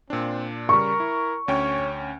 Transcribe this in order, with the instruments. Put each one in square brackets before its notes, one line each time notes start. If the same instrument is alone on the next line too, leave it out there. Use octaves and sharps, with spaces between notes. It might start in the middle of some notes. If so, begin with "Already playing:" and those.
[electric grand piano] A#2 D4 [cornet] C4
[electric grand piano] C#3 G3 [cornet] A#4 [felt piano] C#6
[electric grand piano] E4
[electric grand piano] D2 C#4 G5 [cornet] C#5